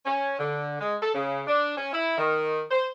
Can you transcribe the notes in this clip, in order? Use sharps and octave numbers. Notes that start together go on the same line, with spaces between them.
C#4
D3
G#3
A4
C#3
D4
C#4
E4
D#3
C5